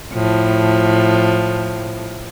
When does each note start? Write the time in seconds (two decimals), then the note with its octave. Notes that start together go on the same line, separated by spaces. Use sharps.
0.13 A2 F3